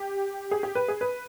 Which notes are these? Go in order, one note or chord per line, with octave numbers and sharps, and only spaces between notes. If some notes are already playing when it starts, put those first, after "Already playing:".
Already playing: G4
G#4
G4
B4
G#4
B4